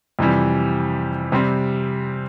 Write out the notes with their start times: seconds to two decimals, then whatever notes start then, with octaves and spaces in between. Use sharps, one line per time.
0.19 F2 C3 E3 G3
1.32 C3 G3 C4